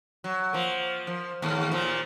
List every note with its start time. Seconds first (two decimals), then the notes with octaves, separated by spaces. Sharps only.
0.24 F#3
0.53 F3 A#3
1.07 F3
1.42 D#2 A2
1.72 A#2 F3